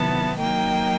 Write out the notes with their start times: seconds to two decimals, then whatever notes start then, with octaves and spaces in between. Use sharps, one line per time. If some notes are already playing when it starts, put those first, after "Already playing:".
Already playing: C3 D#3 F#3 B3 E4 A5
0.38 F#3 A#3 D#4 G5